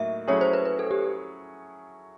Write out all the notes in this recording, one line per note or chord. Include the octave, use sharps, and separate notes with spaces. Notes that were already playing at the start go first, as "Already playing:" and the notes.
Already playing: A2 F#3 A#3 D#4 E5
F#3 A3 C#4 E4 G#4 C#5
C5
B4
B4
A4
G4